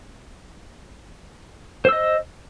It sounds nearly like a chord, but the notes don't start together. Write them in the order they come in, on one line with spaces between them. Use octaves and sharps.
C5 E6 D#5